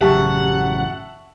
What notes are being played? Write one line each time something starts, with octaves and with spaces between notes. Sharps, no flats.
A1 F#2 C#3 G4 E5 F#5 A5 C#6